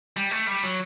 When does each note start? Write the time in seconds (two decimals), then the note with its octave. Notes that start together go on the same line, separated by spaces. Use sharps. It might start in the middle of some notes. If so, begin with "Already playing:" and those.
0.17 G3
0.31 A3
0.47 G3
0.63 F#3